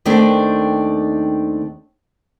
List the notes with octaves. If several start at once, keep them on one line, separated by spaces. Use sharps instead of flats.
D#2 D#3 A3 C4 D4